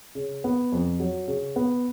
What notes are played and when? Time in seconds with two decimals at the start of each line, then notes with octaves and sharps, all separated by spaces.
0.15 C#3
0.44 B3
0.72 F2
1.00 F#3
1.28 C#3
1.56 B3